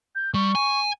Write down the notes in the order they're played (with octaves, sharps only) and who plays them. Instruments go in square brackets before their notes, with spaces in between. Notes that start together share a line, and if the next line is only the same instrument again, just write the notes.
[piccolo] G6
[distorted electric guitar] G3 [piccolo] C#6
[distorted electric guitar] G#5